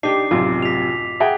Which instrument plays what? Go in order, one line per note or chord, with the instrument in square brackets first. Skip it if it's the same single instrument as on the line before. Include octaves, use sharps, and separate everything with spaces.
[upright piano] D4 [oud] D#4 G4 [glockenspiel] D6 C7
[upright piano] A1 F#2 C3 [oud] F4
[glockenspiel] B6 F7
[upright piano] G#4 F#5 G5 [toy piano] E5